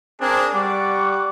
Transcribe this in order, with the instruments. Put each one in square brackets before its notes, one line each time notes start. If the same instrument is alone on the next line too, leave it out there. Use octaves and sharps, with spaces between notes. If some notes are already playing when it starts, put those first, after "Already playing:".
[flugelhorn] C4 [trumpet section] D4 A#4 [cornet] G#4
[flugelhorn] G3 [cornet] D5 [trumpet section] F#5 C#6 [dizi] D6